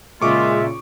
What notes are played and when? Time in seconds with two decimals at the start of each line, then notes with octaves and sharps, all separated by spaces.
0.22 A#2 C#3 G#3 A#3 F4 E5 C#6 D6